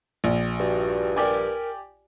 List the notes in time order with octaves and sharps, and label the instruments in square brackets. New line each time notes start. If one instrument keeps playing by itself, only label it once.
[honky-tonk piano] A#1
[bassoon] G2 [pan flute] F#4
[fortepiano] G4 D5 G#5 [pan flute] A#4